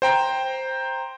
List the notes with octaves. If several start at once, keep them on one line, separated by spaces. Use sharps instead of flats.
C5 G5 A#5